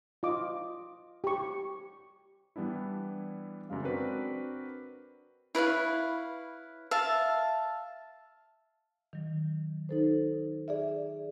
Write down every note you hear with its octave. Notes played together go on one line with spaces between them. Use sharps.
F4 D5 D#5 D6
G4 C#6
E3 G3 B3 D4 E4
F#2 C#3 G#3 F5
C4 D4 F#4 A#4 B4 D5
E4 B4 C#5 F5
E5 F5 A5
D#3 F#3
D#4 A4 C5
G#4 D5 E5